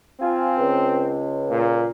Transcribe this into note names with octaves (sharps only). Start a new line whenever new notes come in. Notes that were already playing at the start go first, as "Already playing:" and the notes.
C4 F4 G#5
C#2
A#2